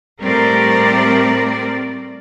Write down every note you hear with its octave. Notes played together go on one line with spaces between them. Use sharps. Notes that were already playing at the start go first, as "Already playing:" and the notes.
A2 G3 A3 C4 A#4 D5